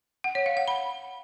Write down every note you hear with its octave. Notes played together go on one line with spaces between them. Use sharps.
F#5
C#5
F5
F#5
B5